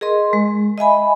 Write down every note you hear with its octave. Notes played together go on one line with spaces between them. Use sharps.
G#4 A#4 D#5 C6
G#3
D#5 E5 G#5 B5